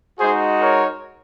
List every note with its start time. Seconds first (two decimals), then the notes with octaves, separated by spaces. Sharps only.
0.20 G#3 D#4 F#4 G#4 C5
0.61 A#4 C#5